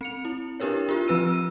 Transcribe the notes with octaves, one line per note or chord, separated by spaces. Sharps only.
C4 C#7 F7
E4
D4 E4 G4 A#4 B4 C#5
F4 G4
F3 C4 B4 E6 D#7